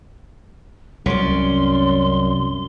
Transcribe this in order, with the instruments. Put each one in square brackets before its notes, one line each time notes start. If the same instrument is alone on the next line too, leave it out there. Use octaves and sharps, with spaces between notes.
[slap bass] C2 [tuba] F#2 [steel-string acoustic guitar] C#4 D5 [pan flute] C6